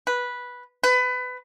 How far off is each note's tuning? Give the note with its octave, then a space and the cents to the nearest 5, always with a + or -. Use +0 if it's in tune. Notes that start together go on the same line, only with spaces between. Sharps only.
B4 -10
B4 +25